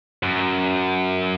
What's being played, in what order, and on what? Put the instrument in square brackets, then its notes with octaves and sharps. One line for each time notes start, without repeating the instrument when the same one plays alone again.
[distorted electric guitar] F#2